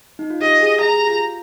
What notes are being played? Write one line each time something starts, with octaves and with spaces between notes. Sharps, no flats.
D#4
F4
G4 D#5
G#4
G#4 A#5
G4
F4